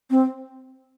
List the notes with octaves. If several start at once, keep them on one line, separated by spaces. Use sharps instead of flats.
C4